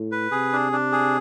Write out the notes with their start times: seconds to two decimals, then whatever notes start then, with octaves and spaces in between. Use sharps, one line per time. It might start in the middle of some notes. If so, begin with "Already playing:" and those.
Already playing: A2
0.12 B4
0.31 C3 G#4
0.52 D4
0.72 D4
0.92 G#4